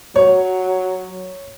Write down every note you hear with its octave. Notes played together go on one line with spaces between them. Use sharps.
F#3 C#5